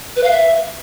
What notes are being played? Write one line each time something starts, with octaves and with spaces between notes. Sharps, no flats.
B4
F5
E5